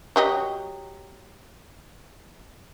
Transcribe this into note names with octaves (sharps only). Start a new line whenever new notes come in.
F#3 G4 D#5